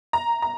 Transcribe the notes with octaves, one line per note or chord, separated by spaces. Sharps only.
A#5
A#5